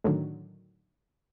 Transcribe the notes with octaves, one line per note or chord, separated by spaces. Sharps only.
A2 D3 D#3 F#3